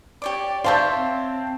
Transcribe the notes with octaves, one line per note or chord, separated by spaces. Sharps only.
G4 C#5 D5 D6
C5 C#5 E5 F5 A5 G6
C4